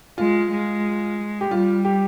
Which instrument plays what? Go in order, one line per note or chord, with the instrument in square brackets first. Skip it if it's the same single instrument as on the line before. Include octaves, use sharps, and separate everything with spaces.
[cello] G#3 [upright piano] F4
[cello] G#3
[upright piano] G4
[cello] G3 [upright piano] F4
[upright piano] G4